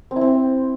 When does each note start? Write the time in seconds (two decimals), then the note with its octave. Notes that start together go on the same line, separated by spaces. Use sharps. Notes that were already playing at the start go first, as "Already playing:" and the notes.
0.11 C4
0.16 E4
0.21 C4